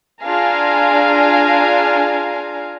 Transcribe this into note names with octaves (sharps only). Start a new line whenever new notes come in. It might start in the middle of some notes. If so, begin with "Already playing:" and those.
D4 F4 G#4 F5 G#5 A#5